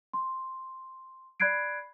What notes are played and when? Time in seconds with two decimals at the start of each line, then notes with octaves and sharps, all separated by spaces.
0.13 C6
1.40 D5 B5 F#6 G#6 C7 D7